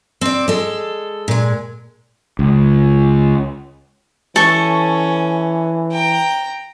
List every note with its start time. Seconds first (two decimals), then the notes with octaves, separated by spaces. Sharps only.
0.21 C4 D5
0.48 G#3 A4
1.28 A#2 G#3
2.39 C#2
4.36 E3 C#4 A4 C#6
5.92 G5 A#5